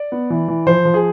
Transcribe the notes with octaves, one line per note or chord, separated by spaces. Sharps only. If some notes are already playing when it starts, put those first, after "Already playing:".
Already playing: D5
B3
E3
E3
F3 C5
F3
G#4